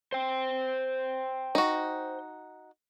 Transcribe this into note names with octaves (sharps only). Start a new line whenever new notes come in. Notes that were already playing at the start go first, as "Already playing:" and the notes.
C5 G5
D#4 F#4